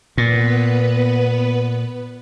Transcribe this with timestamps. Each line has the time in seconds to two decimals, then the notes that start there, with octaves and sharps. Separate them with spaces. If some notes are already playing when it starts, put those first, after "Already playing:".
0.18 A#2 B3 B4